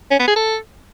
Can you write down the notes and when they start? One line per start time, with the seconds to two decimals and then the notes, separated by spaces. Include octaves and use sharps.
0.11 C#4
0.19 B3
0.28 G#4
0.36 A4